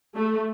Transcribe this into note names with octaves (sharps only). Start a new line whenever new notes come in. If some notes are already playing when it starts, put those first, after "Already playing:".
A3